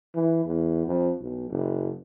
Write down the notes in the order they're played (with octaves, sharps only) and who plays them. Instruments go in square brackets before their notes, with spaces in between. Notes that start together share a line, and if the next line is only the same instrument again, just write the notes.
[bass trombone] E3
E2
F2
B1
F#1